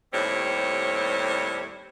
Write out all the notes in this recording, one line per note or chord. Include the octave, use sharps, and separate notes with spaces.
D#2 A2 G3 C4 C5 C#5